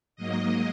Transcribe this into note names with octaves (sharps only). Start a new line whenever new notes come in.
G#2 F#3 A#3 D#5